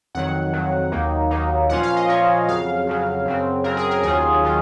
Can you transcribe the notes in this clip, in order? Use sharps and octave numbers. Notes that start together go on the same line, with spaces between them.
F2 D#3 F#3 F#5
F2 D#3 F#3
D#2 D#3 F#3 A#3 D#4
D#2 D#3 F#3 A#3 D#4
A#2 F3 A#3 C#4 F4 F#5
F5
D#5
A#2 F3 A#3 C#4 F4 C#5
F2 C#3 F#3 F5
F2 C#3 F#3
F#2 C#3 F#3 C4
F#2 C#3 F#3 C4 A#4
G#4
A#4
D#2 D#3 F#3 C#4 F4 G#4
D#3 F#3 C#4 F4